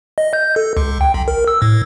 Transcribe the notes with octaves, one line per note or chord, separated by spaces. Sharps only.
D#5
G6
A4
C#2
G5
B1
A#4
E6
A2